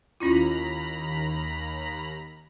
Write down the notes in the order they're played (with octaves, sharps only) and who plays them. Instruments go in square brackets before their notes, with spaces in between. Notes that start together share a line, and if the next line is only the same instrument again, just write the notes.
[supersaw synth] D#2 A#5 B5 [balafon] C#4 E4 F4